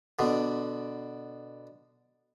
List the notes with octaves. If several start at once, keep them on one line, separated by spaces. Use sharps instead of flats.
B2 D3